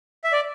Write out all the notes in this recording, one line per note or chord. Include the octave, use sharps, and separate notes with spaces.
E5
D5